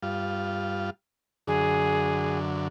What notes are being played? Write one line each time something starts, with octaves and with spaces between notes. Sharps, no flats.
G2 F4
F#2 D3 G#4